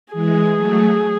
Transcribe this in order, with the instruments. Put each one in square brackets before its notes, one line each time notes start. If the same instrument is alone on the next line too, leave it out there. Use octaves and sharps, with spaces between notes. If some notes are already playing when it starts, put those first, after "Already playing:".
[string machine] E3 G#3 [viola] G#4
[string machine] F#3 A3